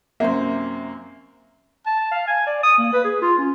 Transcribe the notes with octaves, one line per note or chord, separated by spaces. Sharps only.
F#2 C3 A#3 C5 E5
A5
F5
G#5
D5
D#6
A#3
B4
G#4
F4
C#4